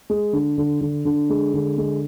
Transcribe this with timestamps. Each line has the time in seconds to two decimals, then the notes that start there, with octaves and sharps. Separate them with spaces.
0.10 G#3
0.33 D3
0.58 D3
0.81 D3
1.05 D3
1.30 G#3
1.54 D3
1.78 G#3